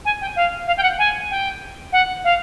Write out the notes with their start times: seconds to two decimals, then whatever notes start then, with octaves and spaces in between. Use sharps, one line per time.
0.05 G#5
0.21 G5
0.36 F5
0.67 F5
0.77 G5
0.82 F#5
0.98 G#5
1.30 G5
1.92 F#5
2.24 F5